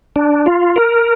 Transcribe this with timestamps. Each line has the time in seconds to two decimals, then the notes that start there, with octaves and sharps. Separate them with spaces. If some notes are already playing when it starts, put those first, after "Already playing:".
0.16 D4
0.46 F4
0.76 A#4